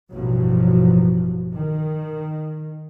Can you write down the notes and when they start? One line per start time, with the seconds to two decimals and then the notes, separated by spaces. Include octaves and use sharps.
0.10 A1 G2 B2 F3 F#3
1.54 D#3